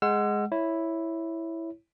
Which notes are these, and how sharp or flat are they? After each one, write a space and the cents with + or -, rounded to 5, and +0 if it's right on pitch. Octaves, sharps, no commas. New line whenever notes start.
G#3 +0 F#5 +0 E6 +40
E4 +0 C#5 +0